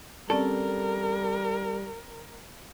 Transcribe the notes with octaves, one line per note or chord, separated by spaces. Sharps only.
G3 C4 C#4 A4 A#4 D5